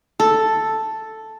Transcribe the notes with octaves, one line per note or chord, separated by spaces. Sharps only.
A4